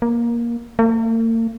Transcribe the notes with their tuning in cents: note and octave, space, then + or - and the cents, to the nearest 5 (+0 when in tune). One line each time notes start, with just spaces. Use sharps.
A#3 +15
A#3 -45